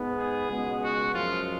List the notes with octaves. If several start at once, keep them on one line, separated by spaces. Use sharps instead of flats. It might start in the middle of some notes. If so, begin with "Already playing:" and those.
Already playing: G#2 G#3 B3
G#4
C#2 B2 G#3 B3
F#4
F#2 F3 G#3 F4